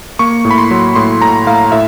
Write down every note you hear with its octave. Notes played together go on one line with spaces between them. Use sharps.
A#3 C#6
A2
B5
C6
F#3
A2 C6
A2 A#5
A2 F5
A2 E5